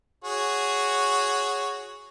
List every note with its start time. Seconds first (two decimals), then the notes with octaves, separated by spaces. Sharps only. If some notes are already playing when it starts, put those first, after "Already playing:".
0.24 F#4 G#4 C#5